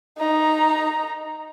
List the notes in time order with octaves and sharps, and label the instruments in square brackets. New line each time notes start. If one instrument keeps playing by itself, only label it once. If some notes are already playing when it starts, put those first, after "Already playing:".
[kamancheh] D#4 A#5